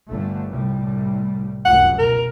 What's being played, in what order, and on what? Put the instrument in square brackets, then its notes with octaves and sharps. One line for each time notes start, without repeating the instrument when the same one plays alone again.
[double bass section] G1 D3 A3
C2 A2 G3
[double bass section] F1 C#2 F#2 [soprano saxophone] F#5
[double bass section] B2 [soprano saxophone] A#4